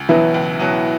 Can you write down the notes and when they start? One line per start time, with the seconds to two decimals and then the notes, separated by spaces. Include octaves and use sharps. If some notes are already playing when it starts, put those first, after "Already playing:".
Already playing: C#2
0.09 B2 E3 F#3 B3 E4
0.34 C#2
0.60 B2 F#3 B3